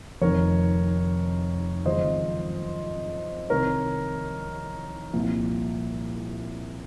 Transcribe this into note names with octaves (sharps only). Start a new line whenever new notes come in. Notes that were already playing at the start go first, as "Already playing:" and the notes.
F1 F2 D#3 A#4 C#5
G#1 F#2 C#3 F3 C5 D#5
C2 C3 D#3 A#4 C#5
C2 A#2 F3